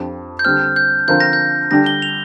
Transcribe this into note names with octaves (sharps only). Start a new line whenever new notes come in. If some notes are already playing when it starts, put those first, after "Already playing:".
Already playing: F2 F3 D4 G4
G6
D3 G3 C4 F6
G6
D3 F3 C4 F4 A#4 G6
A#6
G6
D3 G3 D4 G4 A#6
G7
F7